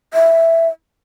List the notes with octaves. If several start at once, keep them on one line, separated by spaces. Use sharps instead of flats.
E5